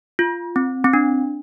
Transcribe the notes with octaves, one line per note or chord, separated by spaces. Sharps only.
F4
C4
C4
D4